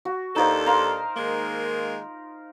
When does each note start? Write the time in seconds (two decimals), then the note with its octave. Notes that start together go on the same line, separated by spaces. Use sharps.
0.05 F#4
0.36 D#2 D4 D#4 F4 A4 C5
0.66 A#4 F5 C6
1.16 D#3 G#3 A#3